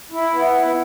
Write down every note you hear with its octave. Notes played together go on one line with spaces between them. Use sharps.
E4
B3
E4